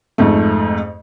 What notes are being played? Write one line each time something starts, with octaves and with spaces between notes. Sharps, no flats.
F2 G#2 A3